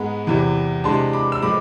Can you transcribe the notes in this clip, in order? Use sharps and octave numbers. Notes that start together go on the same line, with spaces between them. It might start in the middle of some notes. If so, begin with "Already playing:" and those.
Already playing: G#2 G#3 B3 B5
E2 C3 E3
C3 E3 G#3 D4 A5 C6
B5 D6
E6
A2 F3 G#3 B5 D6